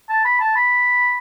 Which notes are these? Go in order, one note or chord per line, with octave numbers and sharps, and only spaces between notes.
A5
B5
A5
B5